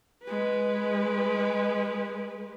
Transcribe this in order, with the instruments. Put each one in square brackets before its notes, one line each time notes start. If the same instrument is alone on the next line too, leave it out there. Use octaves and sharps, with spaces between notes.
[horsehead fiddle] G#3 B4